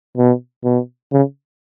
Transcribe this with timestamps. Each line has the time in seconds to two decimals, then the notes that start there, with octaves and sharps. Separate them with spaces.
0.17 B2
0.64 B2
1.12 C#3